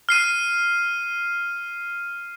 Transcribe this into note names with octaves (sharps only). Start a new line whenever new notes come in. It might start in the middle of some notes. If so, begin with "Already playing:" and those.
F6 C7 D#7